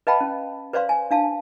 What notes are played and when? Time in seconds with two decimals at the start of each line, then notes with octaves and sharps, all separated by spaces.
0.07 B4 D#5 F5 G5 A5 B5
0.21 C#4
0.73 B4 C5 D5 F5 C6
0.89 G#5
1.11 D4 F5 A5